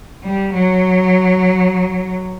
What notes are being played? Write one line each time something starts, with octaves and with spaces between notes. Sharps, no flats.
G3
F#3